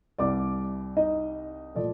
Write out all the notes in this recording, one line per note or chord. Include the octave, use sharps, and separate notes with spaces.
C2 C3 G3 D5 D6
D#4 D#5
A#2 F3 A3 D5